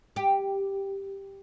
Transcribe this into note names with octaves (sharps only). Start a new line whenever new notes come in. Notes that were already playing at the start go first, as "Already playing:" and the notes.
G4